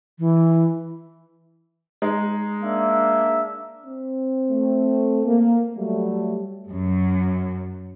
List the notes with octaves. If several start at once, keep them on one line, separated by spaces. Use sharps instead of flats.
E3
G#3 D#4
A#3 D4 E5
C4
A3
A#3
F#3 G3 A3
G4
F#2